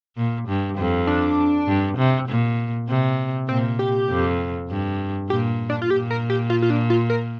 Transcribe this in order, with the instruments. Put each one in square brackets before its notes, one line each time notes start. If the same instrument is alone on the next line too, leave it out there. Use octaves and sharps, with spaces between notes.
[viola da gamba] A#2
G2
F2
[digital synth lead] D4
[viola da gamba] G2
C3
A#2
C3
[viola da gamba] A#2 [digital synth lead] C4
[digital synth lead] G4
[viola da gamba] F2
G2
[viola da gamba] A#2 [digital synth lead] G4
[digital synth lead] D4
F4
[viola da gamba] A#2 [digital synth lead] G4
[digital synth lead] A#4
G4
F4
F4
D4
F4
A#4